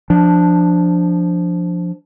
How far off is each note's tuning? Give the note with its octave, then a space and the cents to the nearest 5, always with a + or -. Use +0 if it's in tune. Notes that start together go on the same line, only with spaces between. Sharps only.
F3 +0 D4 +0